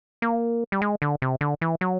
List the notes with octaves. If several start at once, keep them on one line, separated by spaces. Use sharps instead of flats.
A#3
G3
G#3
D3
C3
D3
E3
F#3